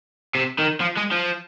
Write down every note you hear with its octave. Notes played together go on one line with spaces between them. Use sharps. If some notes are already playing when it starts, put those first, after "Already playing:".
C3
D#3
F3
G#3
F3